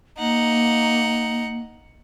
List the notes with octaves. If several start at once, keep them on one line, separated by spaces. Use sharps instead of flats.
A#3 D#4 F#5